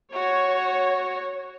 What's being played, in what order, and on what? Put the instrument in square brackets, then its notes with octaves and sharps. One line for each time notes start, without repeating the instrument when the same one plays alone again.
[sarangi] F#4 [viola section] C#5